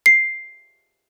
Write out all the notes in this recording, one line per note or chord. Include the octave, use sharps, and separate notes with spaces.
C7